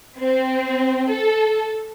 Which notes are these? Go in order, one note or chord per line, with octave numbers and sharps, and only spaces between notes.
C4
A4